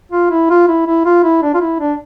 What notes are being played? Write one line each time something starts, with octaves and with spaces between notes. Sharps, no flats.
F4
E4
F4
E4
E4
F4
E4
D4
F4
E4
D4